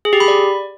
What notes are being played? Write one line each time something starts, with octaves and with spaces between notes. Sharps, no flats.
G#4
G4
B5
D5